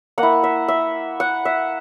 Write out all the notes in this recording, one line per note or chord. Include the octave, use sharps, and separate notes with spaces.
A#3 F#5
E4
E5
E5
F#5
E5